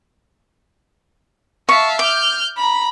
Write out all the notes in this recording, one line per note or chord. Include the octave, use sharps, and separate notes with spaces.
E5 F5 A5 C#6
D6 F6 G6
A#5 B5